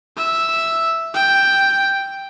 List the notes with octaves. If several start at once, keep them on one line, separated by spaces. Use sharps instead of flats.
E5
G5